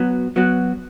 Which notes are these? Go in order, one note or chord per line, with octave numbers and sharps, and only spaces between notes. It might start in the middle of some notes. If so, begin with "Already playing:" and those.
Already playing: F#3 B3 F#4
F#3 B3 F#4